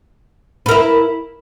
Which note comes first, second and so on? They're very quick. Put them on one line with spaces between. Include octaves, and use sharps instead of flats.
B4 A#4 E4